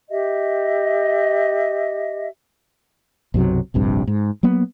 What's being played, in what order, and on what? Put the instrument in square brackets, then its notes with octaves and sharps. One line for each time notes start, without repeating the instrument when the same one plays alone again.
[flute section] G4 D#5 E5
[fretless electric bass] B1 F#2 C3 F#3
F1 A#1 G2 C3
G#2
F#3 A#3 B3